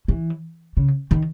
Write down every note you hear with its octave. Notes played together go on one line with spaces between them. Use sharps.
E3
C#3
D#3